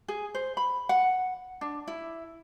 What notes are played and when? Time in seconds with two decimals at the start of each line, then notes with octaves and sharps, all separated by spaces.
0.08 G#4
0.35 C5
0.57 B5
0.89 F#5
1.61 D4
1.87 E4